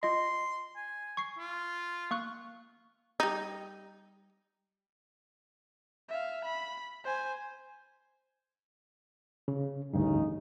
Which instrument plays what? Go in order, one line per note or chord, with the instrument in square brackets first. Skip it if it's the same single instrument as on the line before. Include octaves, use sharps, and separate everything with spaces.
[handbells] F4 D#5 [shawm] C6
[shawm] G#5
[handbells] C#6 C7
[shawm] F4
[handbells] A#3 C#6 F#6
[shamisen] G3 D#4
[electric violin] E5 F5
B5
C5 G#5
[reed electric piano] C#3
[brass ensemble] A1 C#3 D#4 [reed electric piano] D2 G2